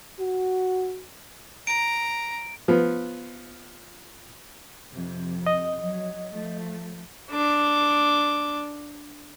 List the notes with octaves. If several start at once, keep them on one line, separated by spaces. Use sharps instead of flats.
F#4
A#5 D7
F3 B3
F2 C3
D#5
F#3
F3 A3
D4 D6